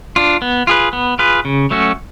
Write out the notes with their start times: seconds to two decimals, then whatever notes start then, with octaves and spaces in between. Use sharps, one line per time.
0.16 D4 F4
0.42 B3
0.67 F4 G#4 B4
0.93 B3
1.19 F4 G#4 B4
1.45 C#3
1.70 F#3 A3 C#4 F#4